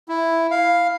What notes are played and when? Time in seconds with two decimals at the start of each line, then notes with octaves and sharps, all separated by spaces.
0.09 E4
0.51 F5